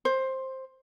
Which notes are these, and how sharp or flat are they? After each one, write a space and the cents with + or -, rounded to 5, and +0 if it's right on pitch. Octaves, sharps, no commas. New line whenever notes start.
C5 +10